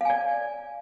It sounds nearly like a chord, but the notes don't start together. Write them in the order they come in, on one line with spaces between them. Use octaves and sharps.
F5 G#5 D5